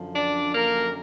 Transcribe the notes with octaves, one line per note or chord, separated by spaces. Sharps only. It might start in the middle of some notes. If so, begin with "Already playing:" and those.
Already playing: F#2 D3 F3
D4 D5
A#3 A#4